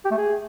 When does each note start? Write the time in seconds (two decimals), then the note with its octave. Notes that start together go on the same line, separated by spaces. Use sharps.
0.05 G4
0.11 A3
0.18 G#4